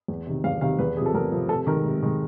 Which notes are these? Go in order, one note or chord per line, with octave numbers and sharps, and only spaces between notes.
E2
C3 D#3
E2 F5
C3 D#3 F5
E2 B4
C3 F3 G#4
A4
E2 A#4
C3 F3
C3 A4
D#3 G#3 A#4
C3
D#3 G#3